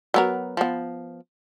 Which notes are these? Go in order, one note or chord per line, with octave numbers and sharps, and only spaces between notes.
F#3 B3 A#4
F3 B3